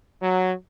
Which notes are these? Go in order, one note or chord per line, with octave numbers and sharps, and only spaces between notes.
F#3